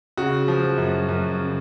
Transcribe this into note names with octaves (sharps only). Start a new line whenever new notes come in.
C#3 F#4
F3
F#2
F#2
C#3